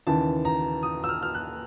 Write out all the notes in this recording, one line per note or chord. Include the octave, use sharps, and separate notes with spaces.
D#2 C#3 E3 A5
A#5
D#6
E6
F6
F6
F#6